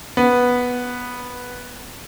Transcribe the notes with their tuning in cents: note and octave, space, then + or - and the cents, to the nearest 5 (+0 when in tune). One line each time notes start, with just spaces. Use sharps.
B3 -5